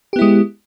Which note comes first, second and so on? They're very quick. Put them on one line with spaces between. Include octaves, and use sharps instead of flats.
G4 B3 E4 G#3